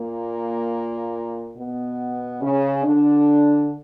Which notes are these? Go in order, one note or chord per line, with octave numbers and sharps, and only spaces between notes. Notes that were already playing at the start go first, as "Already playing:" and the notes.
Already playing: A#2 A#3
B2 B3
C#3 C#4
D3 D4